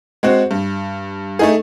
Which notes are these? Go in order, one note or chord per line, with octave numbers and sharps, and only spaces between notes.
G#3 C4 F#4
G2
A3 D#4 G#4